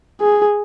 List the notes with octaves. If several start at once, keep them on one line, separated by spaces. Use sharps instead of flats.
G#4